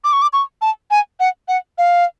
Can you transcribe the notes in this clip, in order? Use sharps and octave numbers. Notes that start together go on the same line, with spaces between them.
D6
C#6
D6
C#6
A5
G#5
F#5
F#5
F5